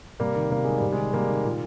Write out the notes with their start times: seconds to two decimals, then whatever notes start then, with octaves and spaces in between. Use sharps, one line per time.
0.20 C3 G3 A#3
0.36 D#3
0.51 C3 A#3
0.65 D#3 G#3
0.78 C3 G3
0.92 D#3 G#3
1.13 C3 G3 A#3
1.29 D#3
1.44 A#2